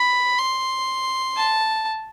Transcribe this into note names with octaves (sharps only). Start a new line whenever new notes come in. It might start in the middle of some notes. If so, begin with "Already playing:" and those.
Already playing: B5
C6
A5